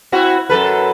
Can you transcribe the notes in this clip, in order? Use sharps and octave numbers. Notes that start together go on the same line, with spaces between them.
C4 E4 F#4
F#2 A4 B4